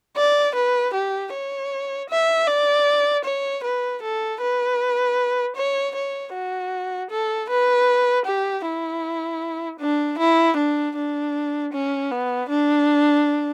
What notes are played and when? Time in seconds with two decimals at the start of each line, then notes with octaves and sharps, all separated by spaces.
0.17 D5
0.55 B4
0.94 G4
1.33 C#5
2.10 E5
2.48 D5
3.25 C#5
3.64 B4
4.02 A4
4.41 B4
5.56 C#5
5.95 C#5
6.33 F#4
7.11 A4
7.49 B4
8.26 G4
8.65 E4
9.80 D4
10.19 E4
10.57 D4
10.96 D4
11.73 C#4
12.11 B3
12.50 D4